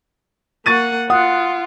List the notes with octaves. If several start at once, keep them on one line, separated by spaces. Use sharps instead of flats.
A#3 F#5 C#6 A6 D#7
F4 F#5 D#6